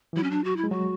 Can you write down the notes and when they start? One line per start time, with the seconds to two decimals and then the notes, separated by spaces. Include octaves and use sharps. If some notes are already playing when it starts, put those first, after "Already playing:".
0.13 E3
0.17 F#3 E4
0.23 C#4
0.31 D4
0.44 F#4
0.57 E4
0.64 G#3
0.71 F#3 F#4